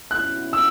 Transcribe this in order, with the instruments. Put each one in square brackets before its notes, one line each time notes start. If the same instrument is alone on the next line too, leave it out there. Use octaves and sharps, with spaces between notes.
[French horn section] B2 G#3 C#4 E4 [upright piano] F#6
[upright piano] E6